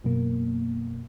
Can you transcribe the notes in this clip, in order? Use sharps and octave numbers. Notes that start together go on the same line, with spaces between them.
F#2 B2 A#3